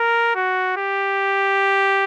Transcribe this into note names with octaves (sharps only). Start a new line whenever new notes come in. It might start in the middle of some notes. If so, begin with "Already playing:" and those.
Already playing: A#4
F#4
G4